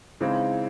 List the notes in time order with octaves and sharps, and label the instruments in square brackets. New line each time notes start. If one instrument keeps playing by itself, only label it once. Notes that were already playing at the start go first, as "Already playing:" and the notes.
[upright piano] C#3 E3 G#3 C4 D#4 [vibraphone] F5